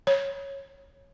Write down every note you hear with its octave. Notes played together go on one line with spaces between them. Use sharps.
C#5